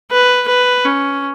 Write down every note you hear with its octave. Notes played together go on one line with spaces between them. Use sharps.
B4
B4
C#4